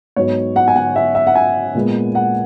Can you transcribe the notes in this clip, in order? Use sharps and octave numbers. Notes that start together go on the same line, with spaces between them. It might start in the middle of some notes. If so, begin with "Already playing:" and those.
G#2 F#3 B3 C#5
F#5
G#5
F#5
E5
E5
F#5
G#5
A#2 G#3 B3
F#5